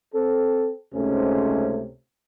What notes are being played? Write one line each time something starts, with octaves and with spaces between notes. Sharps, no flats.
C4 A4
C#2 G#2 C3 A3 C#4